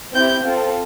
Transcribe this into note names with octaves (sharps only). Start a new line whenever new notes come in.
C4 E4 G4 G6
C4 F4 A4